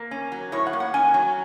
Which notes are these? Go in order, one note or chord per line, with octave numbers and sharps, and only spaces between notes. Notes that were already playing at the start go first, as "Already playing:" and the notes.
Already playing: A#3
C#4
F#3
A2 C#5
F#5
A#3
F#5
C#4 G#5
F#3